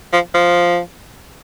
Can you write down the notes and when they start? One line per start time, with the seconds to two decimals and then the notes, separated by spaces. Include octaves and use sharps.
0.13 F3
0.34 F3